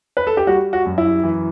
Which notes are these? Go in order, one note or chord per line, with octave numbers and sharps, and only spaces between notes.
B4
A4
G4
G3 F#4
F#4
F#2
E4
E3